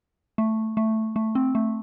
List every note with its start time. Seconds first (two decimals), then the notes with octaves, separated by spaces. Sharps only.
0.38 A3
0.77 A3
1.16 A3
1.35 C4
1.55 A3